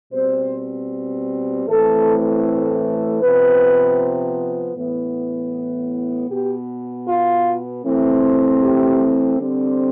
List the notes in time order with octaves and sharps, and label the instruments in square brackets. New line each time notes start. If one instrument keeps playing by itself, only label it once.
[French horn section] B2 G3 C4 C5
A2 E3 A3 C4 A4
C3 F3 B3 B4
A2 E3 B3
B2 B3 G4
F4
E3 A3 C4
G4
D3 G3 C4